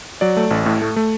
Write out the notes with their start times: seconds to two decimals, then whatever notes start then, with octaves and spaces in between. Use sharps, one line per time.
0.21 F#3 D5
0.37 A3
0.51 A1
0.66 A2
0.81 A3
0.96 A3